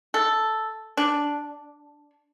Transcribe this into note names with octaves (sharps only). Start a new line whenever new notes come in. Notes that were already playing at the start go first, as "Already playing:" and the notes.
A4
D4